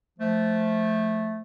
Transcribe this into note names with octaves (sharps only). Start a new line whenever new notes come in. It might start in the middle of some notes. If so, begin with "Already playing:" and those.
F3 A3